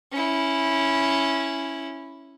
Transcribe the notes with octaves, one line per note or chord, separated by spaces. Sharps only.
C#4 E4